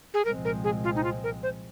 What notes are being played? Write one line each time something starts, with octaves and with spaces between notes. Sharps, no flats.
G#4
C2 A#2 F3 G#3 C4 A#4
A#4
G#4
F4
D#4
F4
A#4
C5